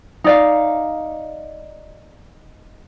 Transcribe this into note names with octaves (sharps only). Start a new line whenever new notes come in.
D#4 D5 F5